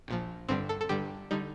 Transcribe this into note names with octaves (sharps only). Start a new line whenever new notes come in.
A#1 A#2 F3
G1 G2 D3 G3 C4
A4
A4
G1 G2 D3 G3 G4
D3 G3 D#4